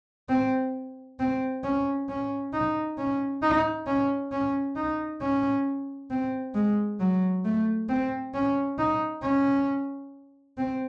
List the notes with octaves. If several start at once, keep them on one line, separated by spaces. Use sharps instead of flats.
C4
C4
C#4
C#4
D#4
C#4
D#4
C#4
C#4
D#4
C#4
C4
G#3
F#3
A3
C4
C#4
D#4
C#4
C4